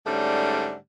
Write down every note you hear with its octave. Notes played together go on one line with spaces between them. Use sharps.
G#2 D3 G3 A3 C#4